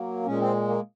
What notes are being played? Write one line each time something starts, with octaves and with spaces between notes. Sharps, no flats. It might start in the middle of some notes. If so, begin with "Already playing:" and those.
Already playing: F#3 A#3
A#2 G#3 C#4
C4
A#3